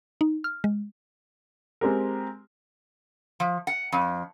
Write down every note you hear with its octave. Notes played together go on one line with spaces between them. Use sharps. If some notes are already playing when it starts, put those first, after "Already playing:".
D#4
F6
G#3
G#3 C4 G4 A#4
F3
F#5
F2